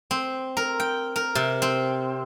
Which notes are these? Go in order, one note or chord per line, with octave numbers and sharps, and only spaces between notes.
C4
A#4
G5
A#4
C3
C4